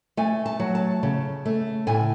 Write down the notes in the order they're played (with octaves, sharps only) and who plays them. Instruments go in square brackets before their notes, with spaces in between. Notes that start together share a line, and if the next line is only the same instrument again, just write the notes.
[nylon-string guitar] A3 G#5
A5
F#3
A5
C#3
A3
A2 G#5